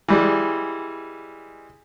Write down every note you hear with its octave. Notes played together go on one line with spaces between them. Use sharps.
E3 G3 G#3